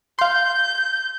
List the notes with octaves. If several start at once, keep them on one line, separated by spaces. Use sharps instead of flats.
F5 C6 G6